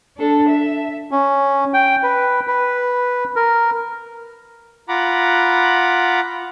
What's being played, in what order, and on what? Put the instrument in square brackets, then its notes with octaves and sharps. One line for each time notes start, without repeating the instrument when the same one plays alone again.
[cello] D4 A4
E5
[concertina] C#4
G5
B4
B4
A#4
[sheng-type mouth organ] F4 F#5 A#5 B5 D6